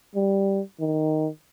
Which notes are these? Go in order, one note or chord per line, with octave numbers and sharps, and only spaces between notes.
G3
D#3